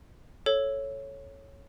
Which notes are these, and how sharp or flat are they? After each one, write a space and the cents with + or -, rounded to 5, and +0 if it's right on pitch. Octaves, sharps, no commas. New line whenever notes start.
A4 -5 C#5 -5